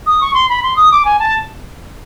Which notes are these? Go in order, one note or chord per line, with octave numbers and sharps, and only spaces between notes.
D#6
C#6
C6
B5
C6
D#6
D6
G#5
A5